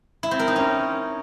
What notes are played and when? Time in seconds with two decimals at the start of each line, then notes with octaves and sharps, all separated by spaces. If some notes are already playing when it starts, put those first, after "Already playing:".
0.23 E4
0.31 C4
0.39 A#4
0.48 D#4
0.56 C#4